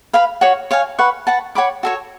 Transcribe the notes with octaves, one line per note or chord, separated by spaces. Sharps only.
B4 F5 B5
F#4 C#5 F#5 C#6
C#5 F5 G#5
B4 F#5 C#6
B4 F#5 A5
C#5 F#5 B5 D6
F#4 A4 C#5